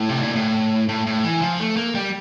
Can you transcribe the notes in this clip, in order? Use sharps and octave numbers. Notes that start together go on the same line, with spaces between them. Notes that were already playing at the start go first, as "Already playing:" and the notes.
Already playing: A2
C3
A#2
A2
A2
A2
E3
F3
A3
A#3
G3